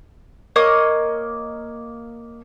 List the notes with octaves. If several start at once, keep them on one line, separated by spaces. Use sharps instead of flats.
A#3 C#5 D#5 D#6